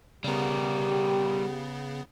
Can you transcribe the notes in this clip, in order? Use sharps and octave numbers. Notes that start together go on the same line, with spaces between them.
C#3 G3 B3 G4 A#4